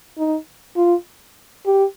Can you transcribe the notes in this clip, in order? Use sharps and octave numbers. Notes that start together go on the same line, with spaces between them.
D#4
F4
G4